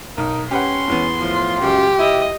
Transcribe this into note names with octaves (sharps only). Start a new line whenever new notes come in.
B1 D#4 A#4
C#4 G4 B4 F#5 C6
E2 E3 B3
A2 F3 F4
C#2 F#2 G4
E4 D#5